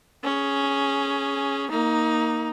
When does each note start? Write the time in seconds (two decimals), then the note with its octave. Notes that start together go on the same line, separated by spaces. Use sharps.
0.24 C#4 G#4
1.70 A#3 D#4